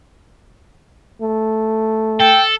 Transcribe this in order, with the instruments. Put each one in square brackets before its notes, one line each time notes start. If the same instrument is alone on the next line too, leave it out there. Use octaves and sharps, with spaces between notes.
[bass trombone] A3
[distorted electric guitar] A4 [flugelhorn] G5